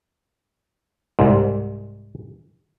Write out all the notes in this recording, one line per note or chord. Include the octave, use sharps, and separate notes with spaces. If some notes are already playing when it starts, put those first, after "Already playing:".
C2 G#2